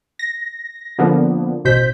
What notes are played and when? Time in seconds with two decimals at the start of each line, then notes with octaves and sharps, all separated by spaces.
0.19 A#6
0.98 D3 F3 A#3 B3
1.65 A1 B2 C5 G6 B6